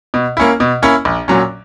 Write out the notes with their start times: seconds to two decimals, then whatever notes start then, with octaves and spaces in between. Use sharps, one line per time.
0.14 B2
0.37 A#3 C#4 E4
0.60 B2
0.82 A#3 C#4 E4
1.05 A#1
1.28 A#2 F#3 C#4